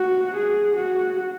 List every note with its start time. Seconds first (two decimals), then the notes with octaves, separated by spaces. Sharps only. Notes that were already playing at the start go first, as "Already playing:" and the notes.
Already playing: F#4
0.35 G#4
0.76 F#4